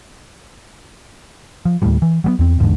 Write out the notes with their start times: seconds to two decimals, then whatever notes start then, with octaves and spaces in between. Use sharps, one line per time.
1.65 F3
1.82 D1 D#2 A2 G3
2.02 E3
2.24 F#3 G3 B3
2.39 E2 C4
2.59 A1 E2 G#2 D3